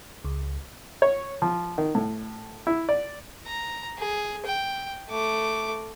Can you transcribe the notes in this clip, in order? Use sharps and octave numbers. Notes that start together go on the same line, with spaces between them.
C#2
C#5
F3
D#3
A2
E4
D5
A#5
G#4
G5
A3 D6